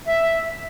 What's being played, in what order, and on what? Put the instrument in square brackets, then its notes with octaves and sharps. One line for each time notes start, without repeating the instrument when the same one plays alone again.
[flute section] E5